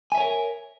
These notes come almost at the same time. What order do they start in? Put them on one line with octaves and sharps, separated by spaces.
G#5 E5 C#5 A#4